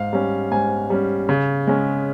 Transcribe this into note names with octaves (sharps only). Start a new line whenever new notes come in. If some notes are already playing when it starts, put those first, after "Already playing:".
Already playing: G#2 F5
G3 C#4
G#2 G#5
G3 C#4
C#3
G#3 C#4